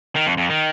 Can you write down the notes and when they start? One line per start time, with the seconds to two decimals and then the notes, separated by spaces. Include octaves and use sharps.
0.16 D#3
0.27 F2
0.37 F2
0.50 D#3